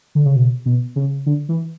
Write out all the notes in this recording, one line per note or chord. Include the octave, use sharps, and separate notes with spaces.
D3
C#3
B2
B2
C#3
D3
E3